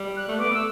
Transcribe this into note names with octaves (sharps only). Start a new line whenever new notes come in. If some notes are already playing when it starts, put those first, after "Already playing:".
Already playing: G3
F#6
A3
B3 D6
A3 E6